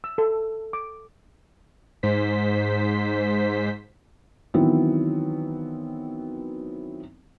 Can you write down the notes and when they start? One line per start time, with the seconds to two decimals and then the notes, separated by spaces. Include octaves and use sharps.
0.04 E6
0.18 A4
0.73 D6
2.03 G#2 C5 B6
4.54 D#3 E3 F#3 B3 C4 E4